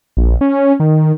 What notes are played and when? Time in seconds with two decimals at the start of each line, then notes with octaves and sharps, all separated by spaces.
0.17 A#1
0.41 C#4
0.80 D#3